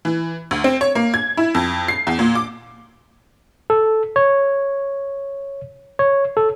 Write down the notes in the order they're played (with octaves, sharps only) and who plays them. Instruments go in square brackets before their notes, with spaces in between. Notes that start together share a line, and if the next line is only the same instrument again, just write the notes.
[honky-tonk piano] E3
D2
C4
C#5
A#3
G#6
E4
F2
C7
E2
A#2
D6
[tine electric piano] A4
C#5
C#5
A4